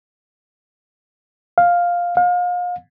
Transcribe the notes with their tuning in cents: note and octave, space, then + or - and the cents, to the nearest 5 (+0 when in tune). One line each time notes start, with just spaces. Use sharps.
F5 +5
F5 +35